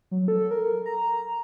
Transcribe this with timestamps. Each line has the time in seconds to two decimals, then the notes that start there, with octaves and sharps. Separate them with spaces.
0.11 F#3
0.28 A4
0.51 A#4
0.86 A#5